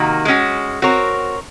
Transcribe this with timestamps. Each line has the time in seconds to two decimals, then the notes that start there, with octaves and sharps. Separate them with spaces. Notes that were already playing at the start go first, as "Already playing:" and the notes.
Already playing: C3 D#3 A#3 D#4 F#4
0.25 G#3 C#4 F#4
0.82 C4 F#4 A#4 C#5